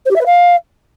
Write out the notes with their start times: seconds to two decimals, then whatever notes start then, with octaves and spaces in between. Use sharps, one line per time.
0.05 C5
0.11 G4
0.16 E5
0.21 B4
0.26 F5